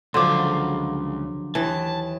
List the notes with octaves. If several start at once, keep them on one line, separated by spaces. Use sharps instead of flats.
C#2 D3 F3 F#3 F5 C6 D6
D#2 E3 A5